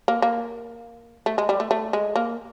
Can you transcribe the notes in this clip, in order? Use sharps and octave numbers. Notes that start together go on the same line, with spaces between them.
A#3
A#3
A3
G#3
G3
A3
A3
G#3
A#3